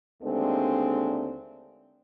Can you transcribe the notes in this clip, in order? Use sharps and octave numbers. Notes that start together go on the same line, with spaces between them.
D#2 D3 G#3 A3 C4 D4